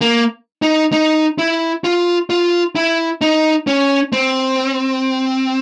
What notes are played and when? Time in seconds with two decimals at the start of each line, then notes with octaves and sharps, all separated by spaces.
0.01 A#3
0.62 D#4
0.92 D#4
1.38 E4
1.84 F4
2.30 F4
2.76 E4
3.21 D#4
3.67 C#4
4.13 C4